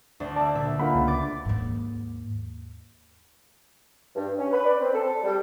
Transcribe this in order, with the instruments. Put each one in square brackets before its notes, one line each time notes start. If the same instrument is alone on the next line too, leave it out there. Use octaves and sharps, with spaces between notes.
[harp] D2 D4
[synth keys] D5 E5 [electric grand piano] A5
[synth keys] A#2 D3 [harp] E5
[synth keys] A#3 F4 A#4 [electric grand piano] D4 F#5 B5
[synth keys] C#2
[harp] D6 A6
[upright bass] D#2 G#2
[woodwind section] G2
C#4
B4
D5
C4
A4
G3